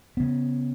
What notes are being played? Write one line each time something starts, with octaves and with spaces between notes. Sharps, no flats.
C#3 B3